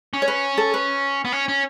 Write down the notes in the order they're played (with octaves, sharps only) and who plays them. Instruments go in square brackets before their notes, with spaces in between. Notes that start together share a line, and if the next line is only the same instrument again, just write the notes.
[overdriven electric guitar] C#4
[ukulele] C#5
B4
A4
B4
[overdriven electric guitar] B3
C#4
C#4